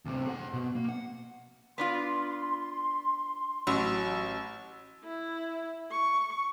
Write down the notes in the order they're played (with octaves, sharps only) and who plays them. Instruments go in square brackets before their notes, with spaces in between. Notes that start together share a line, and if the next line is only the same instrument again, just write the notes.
[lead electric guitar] D2 C3
G#4 F#5
B2
A#3
F#5
[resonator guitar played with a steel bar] B3 D4 F4 [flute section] C6
[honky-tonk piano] A1 [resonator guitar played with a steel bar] F#3
[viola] E4
C#6